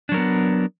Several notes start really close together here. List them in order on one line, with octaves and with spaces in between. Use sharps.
D4 F#3 A#4 B3